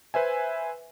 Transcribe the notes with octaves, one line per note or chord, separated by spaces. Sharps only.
B4 C5 E5 G#5